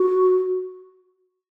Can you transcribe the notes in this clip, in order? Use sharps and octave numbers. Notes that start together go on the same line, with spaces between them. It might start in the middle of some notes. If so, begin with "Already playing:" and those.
Already playing: F#4